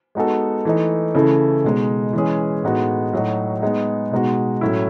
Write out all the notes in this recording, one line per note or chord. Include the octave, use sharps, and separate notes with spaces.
G#3 B3 D#4 F#4 A4
E3 A3 D#4
C#3 E3 A3 E4 A4
B2 G#3 D#4
E3 G#3 C#4 G#4
A2 G#3 B3 D#4 F#4
A2 F#3 A3 D#4 F#4
G#3 B3 D#4 G#4
B2 G#3 D#4 F#4
A2 F#3 A3 C#4 E4